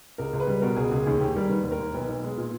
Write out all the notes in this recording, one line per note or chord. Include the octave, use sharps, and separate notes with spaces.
C#2 A#4
C#2
B4
G3
B2 A#4
C#2 G#4
C#2 G#4
D#2 G#4
D#2 G4
G3 A#4
D#3 B4
D#2
A#4
D#2
B1 B4
B1
G#3
A#2